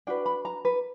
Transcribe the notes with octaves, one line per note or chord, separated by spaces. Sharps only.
D4 F#4 B4 G5
B5
A#5
B4